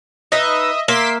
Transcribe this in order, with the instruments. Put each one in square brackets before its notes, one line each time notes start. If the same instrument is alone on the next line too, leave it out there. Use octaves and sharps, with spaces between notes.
[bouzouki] D#4 B4 [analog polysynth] D#5 E5
[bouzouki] A#3 E5 [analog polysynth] C6 D6 B6